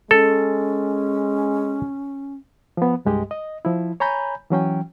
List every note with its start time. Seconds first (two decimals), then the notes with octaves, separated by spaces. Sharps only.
0.11 G#3 C#4 A4
2.77 F3 B3
3.05 C2 G2 G#3 G4 D#5
3.31 D#5
3.65 F3 E4
4.00 C#5 G#5 A#5 B5 G6
4.50 E3 F#3 C#4 G5